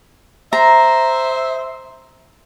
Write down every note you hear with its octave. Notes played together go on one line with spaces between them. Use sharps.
C5 E5 A#5